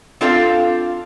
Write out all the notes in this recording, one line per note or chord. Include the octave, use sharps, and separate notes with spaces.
C4 D4 F4 A4 D5 F5